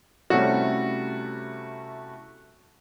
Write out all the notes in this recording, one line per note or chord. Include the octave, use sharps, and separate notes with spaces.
C3 G3 A3 C#4 E4 F#4